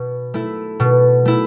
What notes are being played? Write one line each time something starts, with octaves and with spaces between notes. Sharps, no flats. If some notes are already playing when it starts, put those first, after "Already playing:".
Already playing: B2
A3 E4
B2
A3 E4